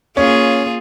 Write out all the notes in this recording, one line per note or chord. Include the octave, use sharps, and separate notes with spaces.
A#3 C#4 F4 G#4